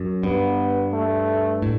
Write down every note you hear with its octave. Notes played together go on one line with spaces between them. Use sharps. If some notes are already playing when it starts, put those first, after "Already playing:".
Already playing: F#2
G2 B3
A3
A2